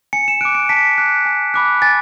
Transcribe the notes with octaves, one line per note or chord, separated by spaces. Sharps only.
G#5 C#7
E7
D6 F#6 D7
C#7
A5 B6
D6 F#6
G#5
B5 D6 F#6
G#5 A6